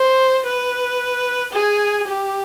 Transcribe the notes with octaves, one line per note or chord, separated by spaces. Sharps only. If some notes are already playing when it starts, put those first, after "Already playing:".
Already playing: C5
B4
G#4
G4